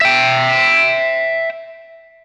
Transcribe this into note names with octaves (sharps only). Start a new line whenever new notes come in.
E5 G5